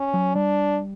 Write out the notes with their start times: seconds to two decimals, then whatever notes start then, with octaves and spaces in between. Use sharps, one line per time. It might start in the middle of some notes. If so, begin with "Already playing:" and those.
Already playing: C#4
0.14 F#3
0.35 G3 D4